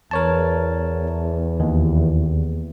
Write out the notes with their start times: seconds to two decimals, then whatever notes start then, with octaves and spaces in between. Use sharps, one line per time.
0.11 E2 A#4 C#5 A5
1.60 D#2